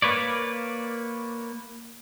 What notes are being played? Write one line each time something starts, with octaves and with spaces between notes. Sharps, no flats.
A#3 B4 C#5 D5